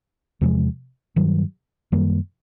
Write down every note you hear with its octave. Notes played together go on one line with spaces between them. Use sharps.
E2 C3 F3 G#3
G2 D#3 F#3
F#2 D#3 G3 A#3